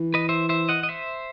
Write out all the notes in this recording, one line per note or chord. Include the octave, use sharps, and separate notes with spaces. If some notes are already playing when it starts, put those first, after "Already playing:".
Already playing: E3
B4 D#5
C5 E5
C5 E5
D#5 F#5
D#5
C5 E5